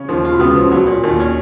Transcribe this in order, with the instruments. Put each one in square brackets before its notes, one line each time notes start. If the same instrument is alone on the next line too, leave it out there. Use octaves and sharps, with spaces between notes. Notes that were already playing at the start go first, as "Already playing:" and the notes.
Already playing: [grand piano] C#3 C#4
[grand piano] D#2 D#3 [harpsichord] F3
[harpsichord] F4
[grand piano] B2
[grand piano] C#2 C#3 [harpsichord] B3
[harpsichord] F3
[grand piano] C#3
[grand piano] B2 [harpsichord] F#3
[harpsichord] A#2
[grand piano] D#2 D#3 [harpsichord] A#2
[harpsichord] C#4